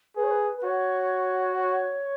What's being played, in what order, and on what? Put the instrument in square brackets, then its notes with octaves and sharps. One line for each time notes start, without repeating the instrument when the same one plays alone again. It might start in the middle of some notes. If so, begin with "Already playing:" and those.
[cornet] G#4 [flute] B4
[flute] C#5
B4
B4
[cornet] F#4 [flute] C#5
[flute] C#5